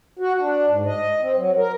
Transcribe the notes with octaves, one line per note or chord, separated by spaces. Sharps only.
F#4
D4
G#2
D#5
C4
F#3
A#4